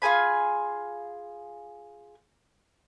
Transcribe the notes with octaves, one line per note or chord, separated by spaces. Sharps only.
F4 G#4 G#5 B5